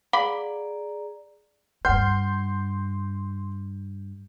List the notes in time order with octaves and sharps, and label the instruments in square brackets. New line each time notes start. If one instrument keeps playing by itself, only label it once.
[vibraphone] G#4 D5 A#5 [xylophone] F5 F#5 D6 [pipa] B5
[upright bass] G2 C4 [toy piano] B4 F#5 [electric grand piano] C6 G6